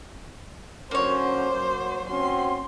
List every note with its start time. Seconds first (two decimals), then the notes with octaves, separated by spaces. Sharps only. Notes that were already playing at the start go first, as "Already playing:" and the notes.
0.91 D3 F#3 A#3 C#4 C5 C#5
1.51 F#3
2.09 C4 C#4 F#4 C6